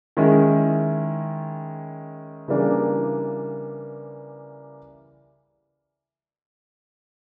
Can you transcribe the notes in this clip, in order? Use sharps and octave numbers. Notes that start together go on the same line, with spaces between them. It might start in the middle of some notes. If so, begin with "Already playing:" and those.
D#3 G#3 C#4 E4
C#3 E3 G3 A#3 D4